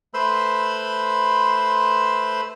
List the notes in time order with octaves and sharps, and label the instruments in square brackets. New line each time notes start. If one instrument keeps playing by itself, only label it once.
[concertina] A3 B4 C5 B5 C6 E6